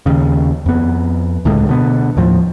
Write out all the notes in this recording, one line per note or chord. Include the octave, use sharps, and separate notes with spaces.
D#2 C#3
F2 B3
C#2 A2 D3 G#3
B2 D3 B3
D#2 A2 F3